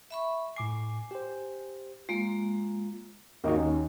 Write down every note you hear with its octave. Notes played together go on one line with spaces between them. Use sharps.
E5 B5 C#6
A2 G#5 D6 C7
G4 C5
G#3 A#3 F4
D#2 A#3 D#4 F#4 D#5
C#4